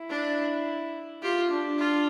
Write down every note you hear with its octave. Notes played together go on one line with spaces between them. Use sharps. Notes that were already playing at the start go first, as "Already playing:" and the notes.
Already playing: E4
D4
F4 G4
D4
F4